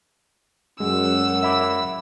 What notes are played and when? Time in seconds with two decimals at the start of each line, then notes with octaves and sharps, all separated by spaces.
0.80 F#2 G#3 F#5 E6
1.43 E5 B5 D6